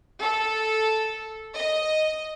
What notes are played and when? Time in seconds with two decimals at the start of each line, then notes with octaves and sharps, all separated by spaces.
0.21 A4
1.55 D#5